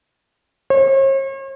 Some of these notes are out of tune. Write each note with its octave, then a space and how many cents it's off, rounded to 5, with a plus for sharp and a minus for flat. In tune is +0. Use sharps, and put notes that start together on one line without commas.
C#5 -45